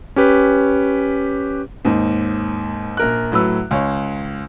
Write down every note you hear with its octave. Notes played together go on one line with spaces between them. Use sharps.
C#4 G4 B4
D#2 G#2
A#1 A#4 F#6
A2 F#3 B4 E6
C#2 C#5